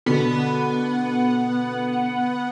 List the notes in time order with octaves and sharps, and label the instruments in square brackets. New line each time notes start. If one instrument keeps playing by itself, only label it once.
[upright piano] B2 D3 [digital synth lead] B3